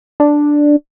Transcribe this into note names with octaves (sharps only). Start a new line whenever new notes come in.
D4